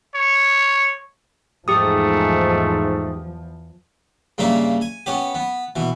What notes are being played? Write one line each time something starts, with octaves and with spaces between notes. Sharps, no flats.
C#5
E2 G#2 F3 A3 G4 D#6
G2 C#3 A#3 D4 E5
G#5
B3 C#4 G4
B3
B2 E3